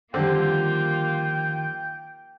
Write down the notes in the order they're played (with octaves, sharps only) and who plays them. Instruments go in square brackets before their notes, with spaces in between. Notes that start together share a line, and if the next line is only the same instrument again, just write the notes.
[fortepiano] D3 C4 [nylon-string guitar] D#3 F3 G3 [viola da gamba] A#3 F4 [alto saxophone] G5